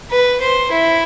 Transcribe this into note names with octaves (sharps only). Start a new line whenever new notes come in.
B4
C5
E4